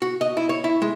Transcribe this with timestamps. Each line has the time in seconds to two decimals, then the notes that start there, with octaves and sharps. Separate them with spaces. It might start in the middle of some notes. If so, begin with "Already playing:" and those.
0.02 F#4
0.21 D#5
0.37 E4
0.49 C#5
0.64 E4
0.82 G#3